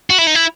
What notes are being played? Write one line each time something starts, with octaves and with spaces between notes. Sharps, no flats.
F#4
E4
D#4
E4